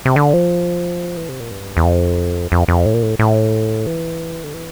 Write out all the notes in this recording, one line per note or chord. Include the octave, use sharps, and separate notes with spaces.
C3
D3
F3
E3
C3
A#2
G2
E2
F2
F2
F2
A2
A#2
A2
A2
E3
D3
E3